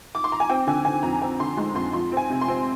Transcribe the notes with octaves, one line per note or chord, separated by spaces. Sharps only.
D6
C6
A#5
G#5
C4 G5
D3 G#5
D3 G#5
F2 A#5
C4 G#5
D3 C6
G#3 C6
F2 C6
F3 C6
C4
G#5
C3
C6
C4